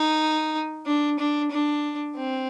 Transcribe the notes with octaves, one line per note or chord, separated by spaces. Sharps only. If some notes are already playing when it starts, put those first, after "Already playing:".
Already playing: D#4
D4
D4
D4
C4